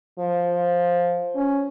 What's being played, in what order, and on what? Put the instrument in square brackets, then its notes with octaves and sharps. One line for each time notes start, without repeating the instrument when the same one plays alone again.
[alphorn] F3
C#4